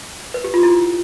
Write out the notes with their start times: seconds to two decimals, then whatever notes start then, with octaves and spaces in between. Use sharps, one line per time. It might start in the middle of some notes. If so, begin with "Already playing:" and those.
0.34 B4
0.44 G4
0.54 F4
0.63 E4